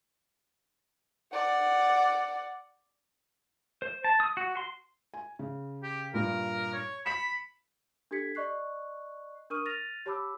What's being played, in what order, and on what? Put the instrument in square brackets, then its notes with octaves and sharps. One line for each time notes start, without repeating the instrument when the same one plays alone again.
[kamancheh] D5 F#5
[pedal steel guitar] C5
A5
D#6
F#4
C6
[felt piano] G#5
C#3
[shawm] G4
[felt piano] G2 A#2 [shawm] A#4
[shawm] C#5
[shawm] B5 [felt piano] B6 C#7 E7
[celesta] D4 G4 A4 G#6 B6 C#7
D5 D#5 C#6 F#6 C7
D4 A#4 C#6 D#6 F6 D#7
F6 A6 A#6 D#7 F7
G4 C#5 A5 B5 D6 E6